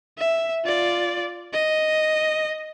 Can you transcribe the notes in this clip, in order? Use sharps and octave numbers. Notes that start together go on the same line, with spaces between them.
E5
F4 D5
D#5